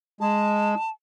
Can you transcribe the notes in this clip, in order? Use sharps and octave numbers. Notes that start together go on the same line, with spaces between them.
G#3 A5